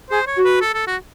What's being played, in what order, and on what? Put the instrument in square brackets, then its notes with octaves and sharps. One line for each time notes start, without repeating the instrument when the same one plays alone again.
[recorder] G#4 [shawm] C5
[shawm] C#5
[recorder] F#4
[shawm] B4
A4
A4
F#4